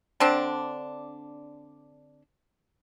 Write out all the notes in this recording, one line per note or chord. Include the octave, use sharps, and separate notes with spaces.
D3 C4 D4